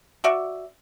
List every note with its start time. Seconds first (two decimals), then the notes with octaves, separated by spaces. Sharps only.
0.24 F#4 D5 E5